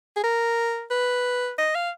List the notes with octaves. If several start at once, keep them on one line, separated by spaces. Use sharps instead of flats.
G#4
A#4
B4
D#5
F5